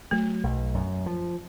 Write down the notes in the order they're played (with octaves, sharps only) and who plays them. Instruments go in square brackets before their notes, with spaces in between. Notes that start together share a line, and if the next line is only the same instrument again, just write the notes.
[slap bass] F#3 [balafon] A3
[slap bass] B1
F#2
F3